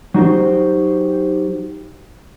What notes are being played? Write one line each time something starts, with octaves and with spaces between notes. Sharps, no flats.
F#3 D#4 F#4 G4 C5